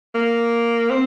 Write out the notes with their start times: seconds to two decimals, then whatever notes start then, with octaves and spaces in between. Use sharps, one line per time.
0.14 A#3
0.90 C4